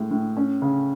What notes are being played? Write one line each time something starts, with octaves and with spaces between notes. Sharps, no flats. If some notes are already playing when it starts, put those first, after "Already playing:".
Already playing: A2 G#3
A2
C#4
C#3